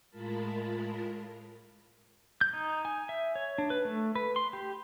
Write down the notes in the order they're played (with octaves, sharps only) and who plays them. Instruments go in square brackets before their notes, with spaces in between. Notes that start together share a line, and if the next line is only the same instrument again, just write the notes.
[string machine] A2 G#3 F4 A#4 A5 B5
[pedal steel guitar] G6
D#4
G#5
E5
C#5
D4
B4
A3
B4
C6
G4